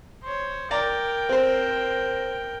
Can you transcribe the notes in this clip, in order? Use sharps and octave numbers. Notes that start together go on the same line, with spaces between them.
C5 C#5
A#4 D5 G5 A#5
C4 C5